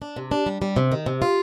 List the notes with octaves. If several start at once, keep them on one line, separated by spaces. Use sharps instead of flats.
D4
C3
D4
G3
G3
C3
D#3
C3
F4